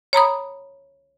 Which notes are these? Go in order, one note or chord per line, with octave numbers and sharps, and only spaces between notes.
C#5 A#5 B5 D#6